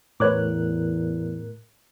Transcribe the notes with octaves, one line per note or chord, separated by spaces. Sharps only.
E2 A2 A#4 B4 C#5 D6 F#6